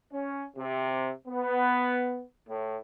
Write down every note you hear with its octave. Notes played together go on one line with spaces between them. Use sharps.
C#4
C3
B3
A2